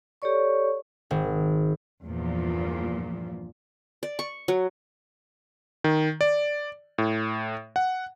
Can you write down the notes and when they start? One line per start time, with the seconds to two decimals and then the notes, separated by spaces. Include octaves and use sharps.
0.22 G4 A4 C#5 D5 C#6
1.11 G#1
2.04 E2 G2 A#2 F3
4.03 D5
4.19 C#6
4.48 F#3
5.84 D#3
6.21 D5
6.98 A2
7.76 F#5